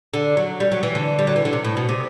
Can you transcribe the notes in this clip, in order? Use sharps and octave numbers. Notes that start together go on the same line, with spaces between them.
D3
F#3
G3
F#3
E3
D3
G3
F#3
E3
D3
C3
A2
B2
C3